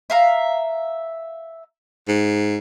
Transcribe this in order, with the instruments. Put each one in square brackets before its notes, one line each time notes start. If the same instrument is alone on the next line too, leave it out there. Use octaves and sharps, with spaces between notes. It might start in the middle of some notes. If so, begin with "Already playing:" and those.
[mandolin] E5 F5 A#5
[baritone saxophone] G#2